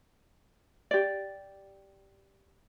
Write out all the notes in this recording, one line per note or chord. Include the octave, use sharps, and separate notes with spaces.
G4 D5